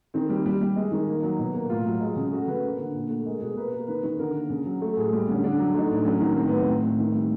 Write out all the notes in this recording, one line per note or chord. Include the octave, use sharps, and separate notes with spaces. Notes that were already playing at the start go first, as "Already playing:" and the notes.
D#3 C4
G3
G3
G3
G#3
D#3
A#3
F#3
B2
A#3
A2 F4
F#3
G#3
C#3
A3 F#4
C#3 B4
A#3
D3
A#2
A3
G#3 A#4
B2 G#4
A#3 B4
A#3
D#3 B4
D#3
D3 A#4
A#3
C#3
F#3
A3 A4
A2 G#4
G3
D3 C#4
D3 D4
F#3
A3 D#4
A2 D4
F#3 C#4
D#3
A2 C4
B3
F#3 C4
A2
A2
D#3
G3